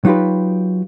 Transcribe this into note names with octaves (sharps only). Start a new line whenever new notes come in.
F#3 D#4 F4 G4 B4